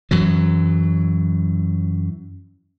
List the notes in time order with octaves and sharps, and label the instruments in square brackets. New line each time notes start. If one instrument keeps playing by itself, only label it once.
[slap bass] F#2 E3 F#3